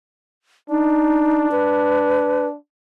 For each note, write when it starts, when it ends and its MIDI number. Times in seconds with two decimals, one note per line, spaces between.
0.70 2.57 62
0.70 1.48 63
1.52 2.47 71